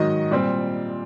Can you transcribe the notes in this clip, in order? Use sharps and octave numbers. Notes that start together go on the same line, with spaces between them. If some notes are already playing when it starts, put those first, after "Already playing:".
Already playing: G#2 D#3 F#3 D#5
A#2 G3 C4